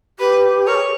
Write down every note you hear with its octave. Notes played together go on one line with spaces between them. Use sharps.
G4 B4
A#4 C#5
G#4